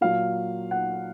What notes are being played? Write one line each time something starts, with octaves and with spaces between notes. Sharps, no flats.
A#2 F#3 F5
F#5